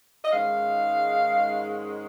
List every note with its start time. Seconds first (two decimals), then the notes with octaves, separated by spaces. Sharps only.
0.24 D#5
0.31 G#2 D#3 G#3 C#4 F5